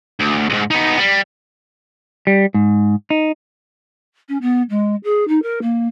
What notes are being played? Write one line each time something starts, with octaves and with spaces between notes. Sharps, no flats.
D2
C2 G#2
B3 D#4
G3
G3
G#2
D#4
C#4
B3
G#3
G#4
D#4
A#4
A#3